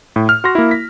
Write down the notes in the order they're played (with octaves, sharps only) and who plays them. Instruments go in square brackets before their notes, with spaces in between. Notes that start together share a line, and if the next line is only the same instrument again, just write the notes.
[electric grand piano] A2
F6
F#4 C6 A#6
A#3 E4
B6